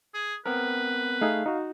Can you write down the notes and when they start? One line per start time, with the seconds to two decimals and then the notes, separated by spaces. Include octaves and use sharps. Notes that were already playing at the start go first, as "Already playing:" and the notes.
0.14 G#4
0.46 B3 C4 A#4 B4
1.21 A3 D#4 G#4 F5
1.46 D#4 F#4